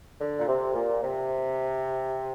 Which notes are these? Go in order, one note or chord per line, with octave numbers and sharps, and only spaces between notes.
D3
A#2
C3
A#2
C3